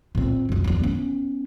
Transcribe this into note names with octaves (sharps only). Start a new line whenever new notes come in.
A#2 C4
C#2 F#2
E2 F#3
B3 C#4